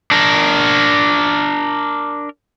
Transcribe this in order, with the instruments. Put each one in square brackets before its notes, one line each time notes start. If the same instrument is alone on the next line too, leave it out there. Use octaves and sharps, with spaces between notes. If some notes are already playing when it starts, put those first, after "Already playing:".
[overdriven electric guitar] D4 A#4